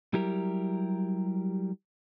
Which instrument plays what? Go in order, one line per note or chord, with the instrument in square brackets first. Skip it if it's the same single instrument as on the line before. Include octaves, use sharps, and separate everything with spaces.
[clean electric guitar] F#3 G3 E4 G4 A#4